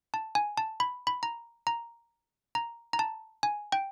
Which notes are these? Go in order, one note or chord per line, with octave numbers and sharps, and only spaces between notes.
A5
G#5
A5
B5
B5
A#5
A#5
A#5
A#5
A5
G#5
G5